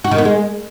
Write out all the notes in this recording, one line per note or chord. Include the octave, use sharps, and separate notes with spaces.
F#4
D#3
B3
G#3